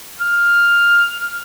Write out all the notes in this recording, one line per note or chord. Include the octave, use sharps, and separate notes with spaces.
F6